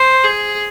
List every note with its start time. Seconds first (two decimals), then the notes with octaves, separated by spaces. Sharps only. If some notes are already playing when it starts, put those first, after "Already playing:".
Already playing: C5
0.23 G#4